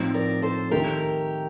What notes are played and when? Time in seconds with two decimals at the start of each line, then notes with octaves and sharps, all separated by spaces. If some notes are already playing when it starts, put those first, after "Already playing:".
Already playing: A2 F3 C4 D#4
0.14 A#4 D5
0.42 A4 C5
0.71 D#3 A3 D#4 G4 A#4